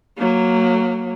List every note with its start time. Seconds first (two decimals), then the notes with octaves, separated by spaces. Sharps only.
0.17 F#3 A#3